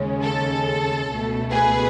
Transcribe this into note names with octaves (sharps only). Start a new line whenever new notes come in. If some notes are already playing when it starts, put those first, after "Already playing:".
Already playing: D#2 C#3 G#3 C#4
A4
C#2 B2 A3
G#4 B4